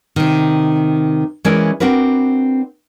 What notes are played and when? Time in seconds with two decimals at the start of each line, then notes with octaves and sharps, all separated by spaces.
0.16 C3 D#3
1.44 E3 G#3 C#4 E4 A#4 D5
1.80 C4 D4 F#4 A#4 B4